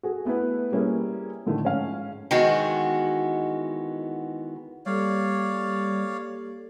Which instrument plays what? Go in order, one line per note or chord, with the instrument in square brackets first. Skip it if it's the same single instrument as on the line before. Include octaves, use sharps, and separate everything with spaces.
[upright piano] F#4 G#4 A4
A3 B3 E4 B4
G3 A#3 C#4 E4 G#4
A2 D3 D#3 F3 A3
G#2 C#4 F5
[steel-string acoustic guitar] D#3 E3 G#3 B3 F#4
[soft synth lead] G3 [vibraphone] A#3 G4 A4 [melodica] C#5 D5 F5